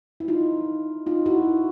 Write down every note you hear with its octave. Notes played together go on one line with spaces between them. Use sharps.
E4
D#4 F4
D#4 F4
E4 F#4